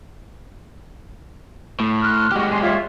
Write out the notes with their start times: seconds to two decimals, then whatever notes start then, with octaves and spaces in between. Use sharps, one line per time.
1.80 A2
2.01 C6 F6 F#6
2.32 G#3 F#4 G4
2.49 G#5 C6
2.61 F4 C#5 E5